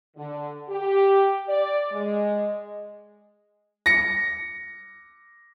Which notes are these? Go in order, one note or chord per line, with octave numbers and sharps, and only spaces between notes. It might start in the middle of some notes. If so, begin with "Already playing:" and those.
D3
G4
D5
G#3
A#6 C#7